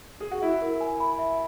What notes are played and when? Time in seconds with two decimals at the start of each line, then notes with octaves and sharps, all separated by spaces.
0.20 G#4
0.31 F#4
0.42 E4 E5
0.62 A#4
0.81 G#5
1.00 B5
1.19 E5